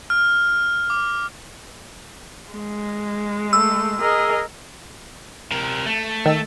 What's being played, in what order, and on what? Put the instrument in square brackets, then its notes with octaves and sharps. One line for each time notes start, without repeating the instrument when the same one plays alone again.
[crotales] F6
D6
[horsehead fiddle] G#3
[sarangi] A3 [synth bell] E6
[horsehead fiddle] G#4 D#5 [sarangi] A#4
[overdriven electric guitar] C3 A#4
A3
[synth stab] D#3 E6